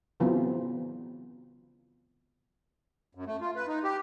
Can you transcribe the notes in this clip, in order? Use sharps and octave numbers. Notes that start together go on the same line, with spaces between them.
C#3 E3 F#3 B3 C4 F4
F#2
A3
F4
B4
D#4
G4